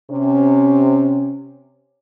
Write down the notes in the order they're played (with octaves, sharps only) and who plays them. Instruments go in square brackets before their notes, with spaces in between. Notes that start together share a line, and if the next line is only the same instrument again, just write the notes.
[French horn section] C3 C#4